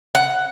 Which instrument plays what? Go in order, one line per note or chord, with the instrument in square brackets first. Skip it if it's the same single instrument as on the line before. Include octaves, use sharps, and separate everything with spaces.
[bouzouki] F#5